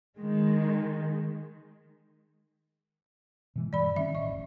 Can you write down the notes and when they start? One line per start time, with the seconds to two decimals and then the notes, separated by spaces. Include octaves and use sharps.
0.17 D#3 G#3
3.56 B2 E3 G#3
3.73 G2 E3 D5 B5
3.96 D#3 C4 C#4 E5
4.15 A1 D#5 C#6
4.31 F1